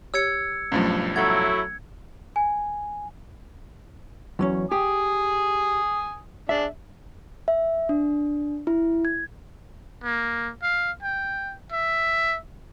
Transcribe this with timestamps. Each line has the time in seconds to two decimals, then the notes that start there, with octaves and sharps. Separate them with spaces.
0.14 G4 C#5 E6 G#6 C#7
0.72 B1 G2 F3 F#3 A3 C#4
1.16 F#3 A3 E4 F#5 G#6
2.36 G#5
4.39 E2 F#3 C#4
4.71 G4 G#5 D#6
6.49 D4 G#4 E5
7.48 E5
7.89 D4
8.67 E4
9.05 G#6
10.04 A#3
10.63 F5
11.03 G5
11.72 E5